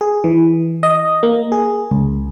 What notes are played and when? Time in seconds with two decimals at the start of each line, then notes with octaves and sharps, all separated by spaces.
0.01 G#4
0.24 E3
0.83 D#5
1.23 A#3
1.52 G#4
1.91 C#2